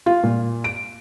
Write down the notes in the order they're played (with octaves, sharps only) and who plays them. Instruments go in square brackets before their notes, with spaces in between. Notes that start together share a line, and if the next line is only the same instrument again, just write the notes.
[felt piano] F4
A#2
D7